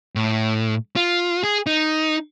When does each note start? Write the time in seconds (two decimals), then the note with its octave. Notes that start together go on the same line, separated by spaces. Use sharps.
0.16 A2
0.96 F4
1.44 G#4
1.67 D#4